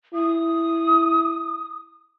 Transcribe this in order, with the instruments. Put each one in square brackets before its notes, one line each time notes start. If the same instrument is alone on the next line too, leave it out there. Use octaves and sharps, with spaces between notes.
[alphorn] E4 [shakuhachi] D#6